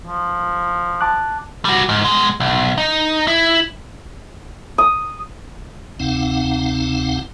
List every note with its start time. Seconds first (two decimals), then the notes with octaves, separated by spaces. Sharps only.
0.05 F3
1.01 A5 D6 F#6
1.65 G3 F#4
1.89 G#2
2.04 B2 G#3
2.40 B1
2.78 D#4
3.27 E4
4.78 D#6
6.00 D2 C3 C4 D#4 F5 F#5